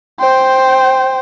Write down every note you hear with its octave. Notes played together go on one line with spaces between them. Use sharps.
C5 G5